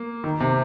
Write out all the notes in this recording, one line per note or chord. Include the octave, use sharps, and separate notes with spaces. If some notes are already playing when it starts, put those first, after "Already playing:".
Already playing: A#3
D#3
C3